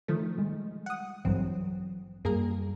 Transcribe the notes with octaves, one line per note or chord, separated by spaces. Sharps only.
D#3 F3 A3
G3 G#3
F#5 D#6
A1 G2 E3 F#3 C4
F#2 G3 A#3 G#4 A#4